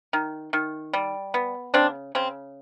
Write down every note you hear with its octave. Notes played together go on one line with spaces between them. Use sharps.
D#3
D#3
G3
B3
C#3 C4 D4
C#3 C4